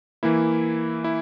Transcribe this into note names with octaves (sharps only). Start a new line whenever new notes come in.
E3 A#3 E4
E4